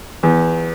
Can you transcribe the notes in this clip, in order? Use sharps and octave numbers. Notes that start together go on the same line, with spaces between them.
E2